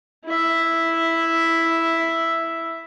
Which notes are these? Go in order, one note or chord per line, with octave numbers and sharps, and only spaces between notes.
E4 E5